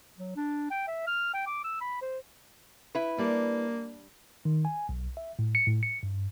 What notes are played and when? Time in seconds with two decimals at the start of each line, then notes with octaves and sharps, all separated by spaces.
0.19 F#3
0.36 D4
0.71 G5
0.88 E5
1.07 F6
1.34 G5
1.47 D6
1.64 E6
1.81 B5
2.02 C5
2.95 E4 B4
3.18 G3 A#3 D4
4.45 D#3
4.65 G#5
4.89 B1
5.17 E5
5.39 A2
5.55 C#7
5.67 A2
5.83 C#7
6.03 G2